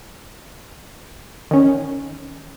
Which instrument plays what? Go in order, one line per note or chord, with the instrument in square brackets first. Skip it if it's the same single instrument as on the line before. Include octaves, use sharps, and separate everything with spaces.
[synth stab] D#3 C#4